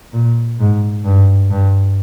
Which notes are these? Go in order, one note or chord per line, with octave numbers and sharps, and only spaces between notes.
A#2
G#2
G2
G2